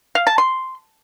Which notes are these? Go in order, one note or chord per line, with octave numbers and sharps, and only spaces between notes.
F5
A5
C6